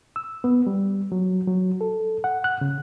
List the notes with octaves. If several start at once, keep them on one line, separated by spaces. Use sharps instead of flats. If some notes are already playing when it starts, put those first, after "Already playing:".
E6
B3
G3
F#3
F#3
A4
F#5
F#6
C#3